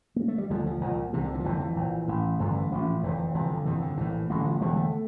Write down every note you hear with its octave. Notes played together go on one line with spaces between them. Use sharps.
A#3
A3
G3
D2 D3 F3
F3
C2 A#2 F3
C2 C3 E3
D3
E3
F3
F1 F2 D3 E3
D3
E3
A#1 A#2
A1 A2
A1 G2 D3 F3
E3
A1 A2 F3
F1 F2 D3 E3
E3
G1 F2 C3 E3
D3
G1 F2 C3 E3
D3
A#1 A2 E3
A1 G2 D3
G3
F3
E1 E2 D3 G3
A3